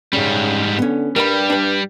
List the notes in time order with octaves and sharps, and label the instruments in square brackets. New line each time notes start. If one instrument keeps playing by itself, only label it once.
[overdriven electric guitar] G#2 G3 [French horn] C#3 [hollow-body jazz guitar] C#4
[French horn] D3 [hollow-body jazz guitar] B3 C#4
[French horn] G2 [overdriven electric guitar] G3 [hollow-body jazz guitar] A#4 F#5 B5
[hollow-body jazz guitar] D4 B4